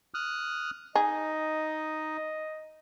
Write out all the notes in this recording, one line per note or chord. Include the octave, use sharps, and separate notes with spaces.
D#6 F6 F#6
D#4 G#4 D#5